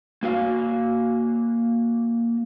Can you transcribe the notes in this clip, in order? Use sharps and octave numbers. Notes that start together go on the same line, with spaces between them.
A#3 F#4 F5